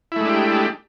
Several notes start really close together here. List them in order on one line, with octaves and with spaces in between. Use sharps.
E4 A3 G#3 D4 G4